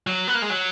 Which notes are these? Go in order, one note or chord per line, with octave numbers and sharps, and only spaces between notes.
F#3
B3
A#3
G#3
F#3